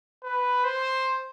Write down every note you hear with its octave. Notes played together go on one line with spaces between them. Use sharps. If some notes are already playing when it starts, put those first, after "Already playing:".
B4
C5